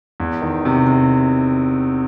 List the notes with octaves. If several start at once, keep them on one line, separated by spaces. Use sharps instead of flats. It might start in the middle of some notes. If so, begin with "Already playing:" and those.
E2
D#3
C3
C3